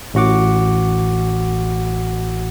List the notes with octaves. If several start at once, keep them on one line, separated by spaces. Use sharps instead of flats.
A1 A2 F#4 F#5 D6